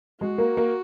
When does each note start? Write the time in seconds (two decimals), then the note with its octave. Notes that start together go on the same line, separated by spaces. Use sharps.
0.20 G#3 F#4
0.38 A#3
0.57 A#3